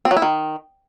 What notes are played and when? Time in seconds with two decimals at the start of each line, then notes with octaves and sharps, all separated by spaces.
0.05 C4
0.11 F#3
0.17 E4
0.22 D#3